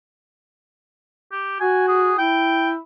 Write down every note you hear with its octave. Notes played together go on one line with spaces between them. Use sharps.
G4
F#4 G#5
G#4
E4 G5